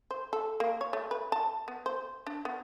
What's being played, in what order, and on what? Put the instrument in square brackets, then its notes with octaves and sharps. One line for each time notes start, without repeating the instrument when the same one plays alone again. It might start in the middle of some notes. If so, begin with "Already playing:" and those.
[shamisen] C5
A4
A#3
C#5
A3
B4
A5
B3
C5
D4
B3